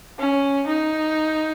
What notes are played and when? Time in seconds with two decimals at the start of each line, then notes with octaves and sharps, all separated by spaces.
0.19 C#4
0.67 D#4